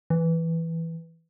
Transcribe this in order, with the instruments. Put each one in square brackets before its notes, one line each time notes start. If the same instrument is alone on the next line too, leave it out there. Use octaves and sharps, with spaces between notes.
[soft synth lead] E3